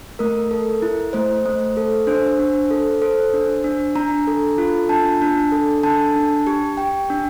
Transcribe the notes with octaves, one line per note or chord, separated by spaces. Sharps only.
A3 A#4
A4
E4
A3 C5
A3
A4
D4 C5
D4
A4
A4 C5
D4
D4
D4 A#5
A4
F4
D4 A5
D4
A4
D4 A5
D4
G4
G4 G5
D4